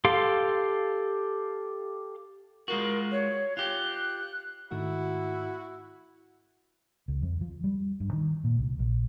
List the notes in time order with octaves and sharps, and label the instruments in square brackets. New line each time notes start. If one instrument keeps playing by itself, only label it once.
[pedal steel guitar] G4 A4 F5 C6
[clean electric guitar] G#3 F4 F#4 [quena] A#4
[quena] C#5
[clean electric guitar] F4 G4 [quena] F#6
[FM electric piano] G#2 D#3 A3 [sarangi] E4 [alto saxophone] F#4
[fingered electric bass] C#2
F2
F3
G3
G2
D#3
A#2
C2
A#1